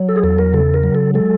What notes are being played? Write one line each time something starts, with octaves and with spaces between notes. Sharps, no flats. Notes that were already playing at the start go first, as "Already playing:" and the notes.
Already playing: F#3
A4
G#4
E2 A4
A#4
C#3 A4
A#4
F#3
A4
G#3 A4